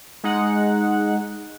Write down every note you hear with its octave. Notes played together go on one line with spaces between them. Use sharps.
G#3 D#4 F#5